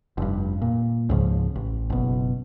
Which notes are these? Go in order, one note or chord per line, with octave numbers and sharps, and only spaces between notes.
F1 G2
A#2
C#2 G#2 C#3 F3
A1
F#1 B2